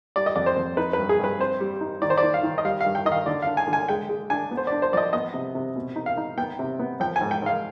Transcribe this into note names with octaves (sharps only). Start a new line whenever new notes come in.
G3 D5
D#5
F2 D5
C5
F2
D#4 B4
G2 B4
G#4
G2 B4
C4 C5
G3
D#4
D#3 D5
C5
D5
D#3
F5
D#3
D#5
G3 F5
G2 F5
G5
D#3 D#5
F5
D3 D5
D4 F5
G#5
D3
G#5
G#3 G5
G#3
D4 G#5
B3
C5
D4 D5
C5
F3 D5 D#5
B3 D#5
C3
C3
B2
D#4
F5
D#4
B3 G5
C3
B3
F3 G5
G#5
G#2
G5
G#2 F5